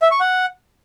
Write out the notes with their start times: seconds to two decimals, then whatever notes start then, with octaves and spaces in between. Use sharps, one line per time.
0.02 E5
0.11 C#6
0.20 F#5